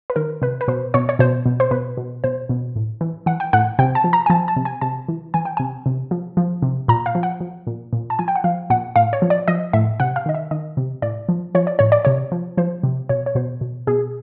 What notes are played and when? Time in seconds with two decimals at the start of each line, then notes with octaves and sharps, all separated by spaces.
0.10 B4
0.16 D#3 A#4
0.42 C3 B4
0.61 B4
0.68 B2 C5
0.94 B2 C#5
1.09 C#5
1.19 B2 C5
1.46 B2
1.60 C5
1.71 B2 B4
1.97 B2
2.24 B2 C5
2.49 B2
2.76 A2
3.01 E3
3.26 E3 F#5
3.40 G5
3.53 A2 F#5
3.79 C3 G5
3.95 A5
4.04 F3
4.13 A#5
4.26 G#5
4.30 F3 A5
4.48 A5
4.56 C3
4.65 G#5
4.81 C3 A5
5.08 E3
5.34 E3 G#5
5.45 G5
5.57 C3 G#5
5.86 C3
6.11 F3
6.37 F3
6.62 C3
6.88 A#2 A#5
7.06 F5
7.15 F3
7.23 F#5
7.41 F3
7.67 A#2
7.93 A#2
8.10 A5
8.19 F3 G#5
8.28 G5
8.36 F#5
8.44 F3 F5
8.70 A#2 F#5
8.96 A2 F5
9.13 C#5
9.22 F3
9.30 D5
9.48 F3 D#5
9.73 A2 E5
10.00 C3 F#5
10.16 F5
10.26 D#3 D#5
10.34 E5
10.51 D#3 D#5
10.77 C3
11.02 A2 D5
11.29 F3
11.55 F3 C#5
11.67 D5
11.79 A2 C#5
11.92 D5
12.05 C3 C#5
12.32 F3
12.57 F3 C5
12.83 C3
13.09 B2 C#5
13.26 C#5
13.35 B2 C5
13.61 B2
13.87 B2 G#4